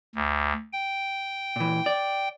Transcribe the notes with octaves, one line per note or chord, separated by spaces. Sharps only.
D2
G5
A#2 E3
D5